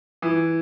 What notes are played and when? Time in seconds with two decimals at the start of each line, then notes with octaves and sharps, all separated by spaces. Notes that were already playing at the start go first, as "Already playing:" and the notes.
0.22 E3